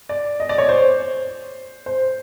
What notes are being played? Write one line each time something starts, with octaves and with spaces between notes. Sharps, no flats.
D5
D#5
D5
C#5
C5
C5